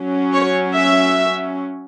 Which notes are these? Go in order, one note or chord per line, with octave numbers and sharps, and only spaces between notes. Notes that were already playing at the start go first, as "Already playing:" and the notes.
Already playing: F#3 C#4
C#5
E5